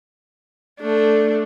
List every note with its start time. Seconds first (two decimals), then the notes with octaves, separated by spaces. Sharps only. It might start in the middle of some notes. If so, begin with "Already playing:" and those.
0.81 A3 D4